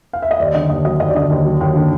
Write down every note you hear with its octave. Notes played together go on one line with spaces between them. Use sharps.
F5
E5
D#5
D#2 D5
D3 D#5
D#2 D#5
F#3 D#5
D#2 D#5
D5
D3 D#5
D#2
F#3
D#2
D3